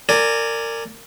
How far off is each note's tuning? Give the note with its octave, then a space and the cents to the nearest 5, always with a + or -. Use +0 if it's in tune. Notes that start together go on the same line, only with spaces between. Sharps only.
A#4 -25 D5 +0 G#5 +0